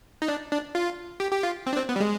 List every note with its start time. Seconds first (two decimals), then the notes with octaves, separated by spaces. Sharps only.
0.22 D#4
0.28 D4
0.51 D4
0.75 F4
1.20 G4
1.32 G4
1.43 F4
1.66 C4
1.73 D4
1.77 C4
1.89 B3
1.96 G3
2.00 G#3